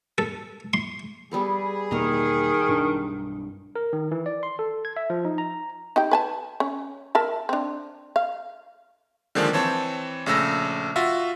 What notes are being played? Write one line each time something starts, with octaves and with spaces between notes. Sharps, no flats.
A4
C6
G3 B3 G#4 A4
E2 B2 D#3 A#3 A#4 E5 A#5
B1 G2 D4
A#4
D#3
E3
D5
C6
A4
G#6
E5
F3
D#4
A#5
D#4 G4 G5
B4 G#5 A5
C#4
A#4 E5 A5
C4 D4
F5
D3 D#3 F3 G#3 A#3 D4
E3 C4 C#5 A5
A#1 C#3 A3 E6 A#6
F4 F#4 E5